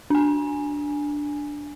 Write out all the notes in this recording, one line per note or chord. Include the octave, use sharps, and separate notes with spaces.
D4 G#5